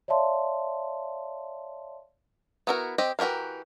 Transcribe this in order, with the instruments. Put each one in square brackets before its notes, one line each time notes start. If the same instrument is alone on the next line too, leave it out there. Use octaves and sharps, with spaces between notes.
[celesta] C#5 D5 E5 F5 A5 C6
[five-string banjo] B3 E4 F#4 A4 A#4
C4 G4 D#5
E3 F#4 G4 A#4 F5